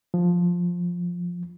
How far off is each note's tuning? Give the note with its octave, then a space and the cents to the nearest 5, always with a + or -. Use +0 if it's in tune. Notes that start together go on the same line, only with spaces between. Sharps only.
F3 +10